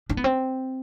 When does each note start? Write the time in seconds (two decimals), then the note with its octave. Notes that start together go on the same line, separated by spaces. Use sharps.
0.10 D4
0.17 B3
0.24 C4